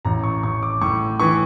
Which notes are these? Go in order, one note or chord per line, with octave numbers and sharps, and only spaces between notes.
A1 A#5
C#6
A1 C#6
D6
A2 C#6
E3 C#6